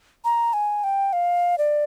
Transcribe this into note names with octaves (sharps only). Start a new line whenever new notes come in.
A#5
G#5
G5
F5
D5